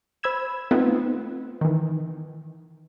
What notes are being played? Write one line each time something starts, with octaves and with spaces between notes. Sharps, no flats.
C5 B5 E6 G#6 E7
A3 B3 C4 D#4 F4 B4
D#3 E3